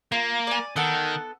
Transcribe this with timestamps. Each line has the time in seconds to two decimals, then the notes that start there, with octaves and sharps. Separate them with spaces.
0.12 A#3 F4
0.47 D5 G#5
0.76 D#3 B3 A4 F#5